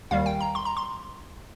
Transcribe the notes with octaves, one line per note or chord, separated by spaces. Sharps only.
D#2 D#3 G3 F5
G5
A#5
C6
A#5
C6